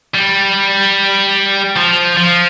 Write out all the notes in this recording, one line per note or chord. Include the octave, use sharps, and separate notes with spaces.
G3
F3
F3